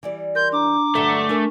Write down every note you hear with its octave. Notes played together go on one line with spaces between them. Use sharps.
E3 G3 D5
A#4 C6 G6
D4 A#5 D6
G2 D3 F#3 A3
D4 A#4 G#5 C#6